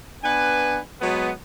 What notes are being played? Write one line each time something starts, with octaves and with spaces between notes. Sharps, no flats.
B3 D4 B4 G#5
F#3 G#3 B3